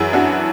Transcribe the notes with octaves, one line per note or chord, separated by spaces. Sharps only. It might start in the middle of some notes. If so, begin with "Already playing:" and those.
Already playing: F#2 E3 E4 G#4
D4 F#4